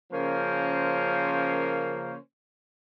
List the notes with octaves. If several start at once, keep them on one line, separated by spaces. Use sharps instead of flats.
C#3 F3 A#3 C#4 A#4 C5